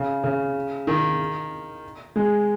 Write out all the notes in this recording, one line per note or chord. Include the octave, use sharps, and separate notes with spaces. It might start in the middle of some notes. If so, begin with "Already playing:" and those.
Already playing: C#3
C#3
D#3
G#3